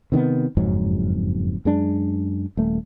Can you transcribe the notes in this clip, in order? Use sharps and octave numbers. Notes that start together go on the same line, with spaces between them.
C3 D#3 F#3 B3
F#1 F2 G#2 F#3
F#2 G#3 D4
D#1 A3